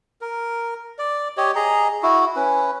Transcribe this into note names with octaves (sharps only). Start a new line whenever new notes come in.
A#4
D5
G4 C#5 D#5
G#4 D#5 A#5
E4 F#4
C#4 B4